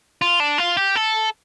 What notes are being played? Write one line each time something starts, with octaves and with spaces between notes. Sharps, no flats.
F4
D4
F4
G4
A4